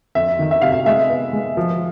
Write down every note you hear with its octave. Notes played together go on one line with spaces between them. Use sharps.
F2 E5
D#3
E5
C3 F5
E5
G#3 E5
B3
G#3
F3